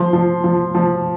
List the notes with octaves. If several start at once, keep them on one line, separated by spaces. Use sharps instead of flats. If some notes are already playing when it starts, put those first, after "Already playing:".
Already playing: F3 C6
F3
F3
F3